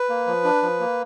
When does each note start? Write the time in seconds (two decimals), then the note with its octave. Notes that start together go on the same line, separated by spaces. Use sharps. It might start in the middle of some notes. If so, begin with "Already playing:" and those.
Already playing: B4
0.09 A#3
0.27 F3
0.44 D4
0.62 F3
0.80 A#3